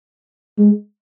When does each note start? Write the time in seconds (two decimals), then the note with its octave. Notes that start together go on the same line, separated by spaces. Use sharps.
0.58 G#3